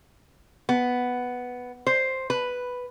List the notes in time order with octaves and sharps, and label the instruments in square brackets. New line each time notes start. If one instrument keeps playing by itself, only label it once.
[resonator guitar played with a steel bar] B3
C5
B4